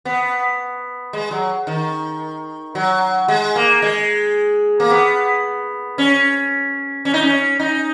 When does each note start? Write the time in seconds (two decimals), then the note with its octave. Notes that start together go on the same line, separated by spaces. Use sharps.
0.05 B3
1.13 G#3
1.31 F#3
1.67 D#3
2.75 F#3
3.28 G#3
3.56 A#3
3.82 G#3
4.80 A#3
4.90 B3
5.98 C#4
7.05 C#4
7.14 D#4
7.23 C#4
7.60 D#4